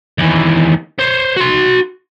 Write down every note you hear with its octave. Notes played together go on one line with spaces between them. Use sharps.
D#2 E3
C5 C#5
F#4 C6